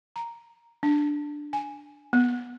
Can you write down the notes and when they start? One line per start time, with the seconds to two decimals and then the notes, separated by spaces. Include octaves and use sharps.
0.16 A#5
0.83 D4
1.53 G#5
2.13 B3